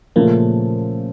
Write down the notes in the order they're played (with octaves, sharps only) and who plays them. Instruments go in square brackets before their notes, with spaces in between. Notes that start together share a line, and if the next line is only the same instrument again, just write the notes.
[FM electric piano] A#2 A#3 [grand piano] C#3 F3 A3 C#4